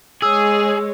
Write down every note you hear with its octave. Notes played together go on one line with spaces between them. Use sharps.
G#3 G#4 C#5 E6